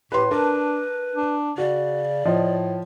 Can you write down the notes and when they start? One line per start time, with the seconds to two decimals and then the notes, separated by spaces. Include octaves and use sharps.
0.12 A2 G4 B4 C6
0.31 D4 A#4 B4 A5
1.15 D4
1.58 C#3 F#4 D5
2.25 A2 F3 D#5